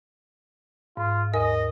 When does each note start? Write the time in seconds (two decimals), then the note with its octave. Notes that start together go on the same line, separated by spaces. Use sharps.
0.97 G#2 F4
1.33 D#2 A#4 D#5 G#5